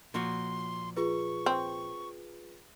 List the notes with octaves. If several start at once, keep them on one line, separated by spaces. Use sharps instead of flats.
A#2 F3 F#4 C6
F4 G#4 B4 C#6
C4